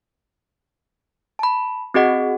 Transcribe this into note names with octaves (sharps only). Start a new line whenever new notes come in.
A5 B5
C4 F#4 G#4 D#5 F#5